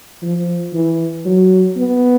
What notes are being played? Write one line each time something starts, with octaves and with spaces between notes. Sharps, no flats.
F3
E3
F#3
B3